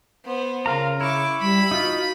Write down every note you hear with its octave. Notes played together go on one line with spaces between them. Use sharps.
B3 C5
C#3 F4 A#4 A#5
E4 C#6 D6
G3 B5
D#4 F4 F#4